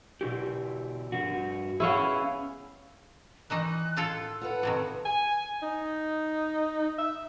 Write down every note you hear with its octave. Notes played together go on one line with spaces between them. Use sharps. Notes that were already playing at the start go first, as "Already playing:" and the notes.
B2 E4 G4
G2 F#4
B3 C#4 E4 G#4 F5
D#3 E3 D#4 F#6
A2 F4 A4 E6
F4 A4 B4 F#5
A2 C3 D#3
G#5
D#4
E5